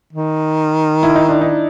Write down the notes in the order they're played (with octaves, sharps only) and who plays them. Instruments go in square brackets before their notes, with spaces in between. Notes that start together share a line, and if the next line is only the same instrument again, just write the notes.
[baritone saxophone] D#3
[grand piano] E4
D#4
D4
D#4